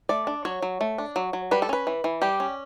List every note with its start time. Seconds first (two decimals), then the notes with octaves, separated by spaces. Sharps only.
0.09 A3 D5
0.27 D4
0.45 F#3 C#5
0.62 F#3
0.81 A3
0.98 D4
1.16 F#3
1.33 F#3
1.51 G3 B4
1.62 A4
1.69 C#4 B4
1.87 E3
2.04 E3
2.22 G3 G4
2.40 C#4